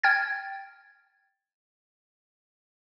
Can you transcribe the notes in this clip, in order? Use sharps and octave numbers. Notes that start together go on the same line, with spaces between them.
G5 F6 G#6 A6